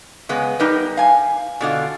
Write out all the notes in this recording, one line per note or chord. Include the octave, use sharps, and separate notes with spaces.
C#3 G#3 B3
G3 D#4 A#4 B4
F5 G#5
B2 D3 F4